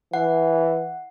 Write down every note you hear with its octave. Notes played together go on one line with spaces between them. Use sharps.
E3 F#5